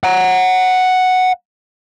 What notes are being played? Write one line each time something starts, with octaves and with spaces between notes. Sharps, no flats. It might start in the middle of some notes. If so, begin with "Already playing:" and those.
F#5 A#5